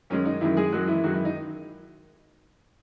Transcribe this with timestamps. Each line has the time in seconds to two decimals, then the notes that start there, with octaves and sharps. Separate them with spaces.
0.10 F#2 D#3 G#3 C#4
0.25 D#4
0.41 F#2 D#3 E3 G#3 E4
0.57 G#3 G#4
0.72 F#2 D#3 F#3 G#3 F#4
0.87 E3 E4
1.04 F#2 D#3 F#3 G#3 F#4
1.14 E3 E4
1.25 D#4